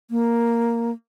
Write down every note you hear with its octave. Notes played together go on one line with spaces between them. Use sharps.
A#3